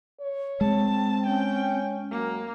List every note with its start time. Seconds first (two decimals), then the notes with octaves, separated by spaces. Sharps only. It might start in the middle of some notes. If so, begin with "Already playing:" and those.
0.20 C#5
0.61 G#3 C4 A5
1.27 C#4 G5
2.12 F#2 A#3